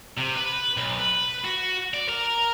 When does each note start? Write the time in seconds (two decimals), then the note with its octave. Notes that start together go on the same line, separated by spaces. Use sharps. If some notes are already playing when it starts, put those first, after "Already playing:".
0.18 C3
0.36 B4
0.77 B1
0.99 B4
1.45 F#4
1.94 D5
2.09 A#4